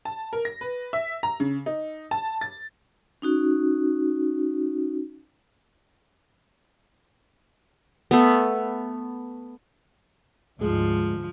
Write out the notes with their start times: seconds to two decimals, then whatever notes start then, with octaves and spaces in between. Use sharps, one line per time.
0.05 A5
0.33 A#4
0.45 A#6
0.61 B4
0.93 E5
1.23 A#5
1.40 C#3
1.66 D#4
2.11 A5
2.41 A6
3.22 C#4 D#4 F#4
8.11 A3 B3
10.61 D2 G#2 F3 G#3